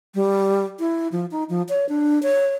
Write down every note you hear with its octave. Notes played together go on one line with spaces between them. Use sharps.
G3
E4
F3
D#4
F3
C#5
D4
C#5